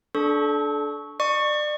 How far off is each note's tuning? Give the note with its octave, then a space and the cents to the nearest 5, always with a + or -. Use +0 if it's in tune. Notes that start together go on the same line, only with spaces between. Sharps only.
D4 +0 A4 -30 C#6 +0
D5 +30 C#6 +0